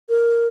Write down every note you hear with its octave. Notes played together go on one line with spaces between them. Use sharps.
A#4